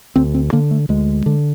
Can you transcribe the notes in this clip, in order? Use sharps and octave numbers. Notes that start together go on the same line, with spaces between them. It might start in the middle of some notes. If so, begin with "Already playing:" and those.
D2 C4
C4
D3 A#3
A3
D2 G#3
D3